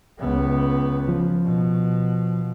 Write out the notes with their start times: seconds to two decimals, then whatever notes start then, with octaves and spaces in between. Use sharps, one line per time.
0.18 C#2 B3
1.08 F3
1.43 B2